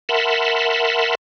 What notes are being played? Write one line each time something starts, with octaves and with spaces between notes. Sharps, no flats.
A#4 E5 F#5 A5 B5 C6